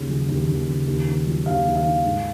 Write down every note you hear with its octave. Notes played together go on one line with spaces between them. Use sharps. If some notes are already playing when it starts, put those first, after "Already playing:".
Already playing: D#2 C#3
F#3
D#2
D#2
C#3
D#2
D#3
F#3
D#2 F5
D#2
F5
D#3
G#2